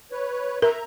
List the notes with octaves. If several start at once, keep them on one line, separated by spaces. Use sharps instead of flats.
B4 C#5
A#4 E5 A#5